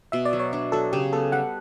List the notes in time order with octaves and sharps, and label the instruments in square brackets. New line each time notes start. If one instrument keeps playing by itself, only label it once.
[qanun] B2 [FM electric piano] E5
[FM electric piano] D5
[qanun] F#3
[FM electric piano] C#5
[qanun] D4
[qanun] F#3 [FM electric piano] A4
[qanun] C#3 [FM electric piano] G4
[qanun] B3 [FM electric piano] A4
[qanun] G3 [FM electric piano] F#5